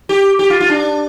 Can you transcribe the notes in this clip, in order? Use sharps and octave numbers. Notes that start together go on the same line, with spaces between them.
G4
G4
F4
F4
D4